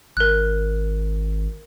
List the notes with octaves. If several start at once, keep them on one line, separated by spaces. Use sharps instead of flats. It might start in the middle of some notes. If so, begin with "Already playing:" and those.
G#1 A#4 F#6